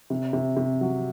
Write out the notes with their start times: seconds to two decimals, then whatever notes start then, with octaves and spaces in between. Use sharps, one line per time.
0.10 C3
0.33 C3
0.57 C3
0.81 F#3